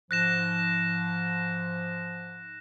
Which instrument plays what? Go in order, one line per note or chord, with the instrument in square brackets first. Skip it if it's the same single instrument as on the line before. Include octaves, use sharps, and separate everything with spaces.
[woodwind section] G#2 F3 [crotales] F#6 A#6 E7